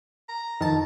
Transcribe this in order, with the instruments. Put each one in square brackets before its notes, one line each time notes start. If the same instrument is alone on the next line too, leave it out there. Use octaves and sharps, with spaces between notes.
[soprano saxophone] A#5
[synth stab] F2 A5 [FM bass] D#3